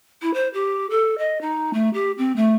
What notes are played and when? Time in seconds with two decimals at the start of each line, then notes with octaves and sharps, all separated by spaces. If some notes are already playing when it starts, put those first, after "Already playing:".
0.22 E4
0.34 C5
0.54 G4
0.90 A4
1.18 D#5
1.41 D#4
1.73 A3
1.94 G4
2.18 C4
2.36 A3